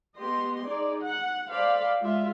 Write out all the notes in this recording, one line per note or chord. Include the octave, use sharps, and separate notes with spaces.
B3 G4 D#5 C6
D#4 G#4 D5
F#5
A4 C5 D5 F5 B5
G#3 F4 E5